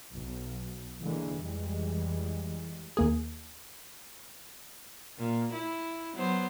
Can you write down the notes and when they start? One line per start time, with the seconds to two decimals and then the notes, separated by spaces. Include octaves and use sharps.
0.14 B1
1.04 D3 E3 G#3 A#3
1.40 F2 E3 G3 G#3
2.97 D#2 A#3 G#4
5.18 A#2
5.53 E4
6.14 F#3 B3 C5